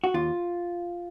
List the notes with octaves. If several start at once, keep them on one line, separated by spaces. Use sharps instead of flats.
F#4
D#2 F4